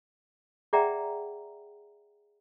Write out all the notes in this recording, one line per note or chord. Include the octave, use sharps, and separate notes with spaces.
G#4 D5 E5 F#5 G5 A#5